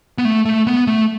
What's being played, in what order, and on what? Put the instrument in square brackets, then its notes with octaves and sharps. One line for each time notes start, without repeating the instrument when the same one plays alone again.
[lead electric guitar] B3
A3
A3
B3
A3